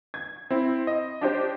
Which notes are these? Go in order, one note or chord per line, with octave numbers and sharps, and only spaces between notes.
G#6
C4 E4
D#5
D4 G4 C5